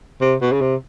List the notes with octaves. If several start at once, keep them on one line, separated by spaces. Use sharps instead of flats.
C3
B2
C#3
C3